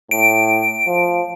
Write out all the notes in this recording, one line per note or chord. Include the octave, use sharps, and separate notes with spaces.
A2 D7
F3